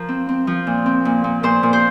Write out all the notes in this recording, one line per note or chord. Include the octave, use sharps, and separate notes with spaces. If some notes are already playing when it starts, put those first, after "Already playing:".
Already playing: F3 A#4
C4
C4
F3
A#2
C4
A#2
A#2
A#2 C5
A#2
C5